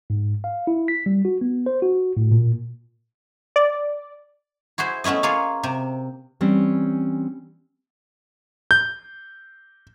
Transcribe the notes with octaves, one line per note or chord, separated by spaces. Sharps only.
G#2
F5
E4
B6
G3
F#4
B3
C5
F#4
A2
A#2
D5
E4 F#4 G#4 C5
A3 B3 C#4 E4 D#5
A#3 F4 G#4 C#5
C3
E3 G3 C4 C#4
G6